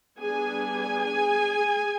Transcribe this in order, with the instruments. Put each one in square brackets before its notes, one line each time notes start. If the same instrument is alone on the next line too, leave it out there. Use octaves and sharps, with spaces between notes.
[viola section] G3 B3 D4 G#4 G#5